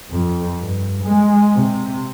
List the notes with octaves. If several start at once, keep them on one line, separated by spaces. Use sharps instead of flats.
F2
G2
G#3
C3